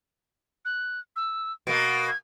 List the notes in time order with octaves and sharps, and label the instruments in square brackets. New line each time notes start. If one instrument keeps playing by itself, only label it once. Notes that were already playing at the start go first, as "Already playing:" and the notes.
[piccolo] F#6
E6
[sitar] B2 A#3 [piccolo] D7
[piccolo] G#6